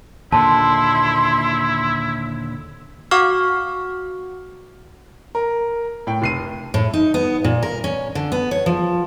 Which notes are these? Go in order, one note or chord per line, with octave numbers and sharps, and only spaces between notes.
D#2 A#2 D3 E4 A5 C6
F#4 F5 F#5 C#6 D6 F6
A#4
A2 G5
F1 C7 D#7
A2
D#4
B3
A#2
A#4
C#4
D3
B3
C#5
F3